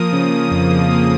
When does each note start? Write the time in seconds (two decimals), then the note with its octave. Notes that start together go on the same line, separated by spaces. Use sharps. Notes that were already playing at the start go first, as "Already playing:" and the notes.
Already playing: F3 A#3 D#6
0.13 C#3
0.32 C#3
0.51 F2
0.71 F3
0.91 A#3